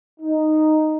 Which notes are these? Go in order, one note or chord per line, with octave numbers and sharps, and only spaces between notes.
D#4